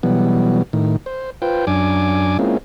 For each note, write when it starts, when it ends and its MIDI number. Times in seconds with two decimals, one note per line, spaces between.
0.03 0.62 47
0.03 0.62 52
0.03 0.62 54
0.03 0.62 55
0.03 0.62 59
0.73 0.96 45
0.73 0.96 51
1.06 1.30 72
1.42 1.65 65
1.42 1.65 71
1.42 1.65 72
1.42 1.65 79
1.67 2.37 42
1.67 2.37 62
1.67 2.37 80
1.67 2.37 86
2.39 2.58 56
2.39 2.58 58
2.39 2.58 60
2.39 2.58 61
2.39 2.58 64
2.39 2.58 65